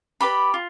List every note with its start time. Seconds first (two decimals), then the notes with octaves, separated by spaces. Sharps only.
0.21 G4 B4 D5 B5
0.54 F4